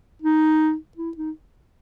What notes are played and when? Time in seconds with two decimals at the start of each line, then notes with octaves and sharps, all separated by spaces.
0.22 D#4
0.97 E4
1.17 D#4